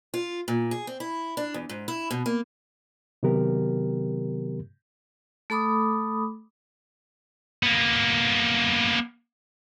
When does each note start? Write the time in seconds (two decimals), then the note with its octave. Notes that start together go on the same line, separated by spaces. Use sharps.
0.14 F4
0.48 A#2
0.71 G#4
0.87 C4
1.00 E4
1.37 D4
1.54 E2
1.69 G#2
1.88 E4
2.11 B2
2.26 A#3
3.23 C3 D#3 F#3 B3 G4 A#4
5.50 A3 A4 B5 D6 D#6
7.63 A#3 B3